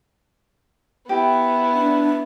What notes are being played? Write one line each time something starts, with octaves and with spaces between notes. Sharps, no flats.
B3 E4 G4
D4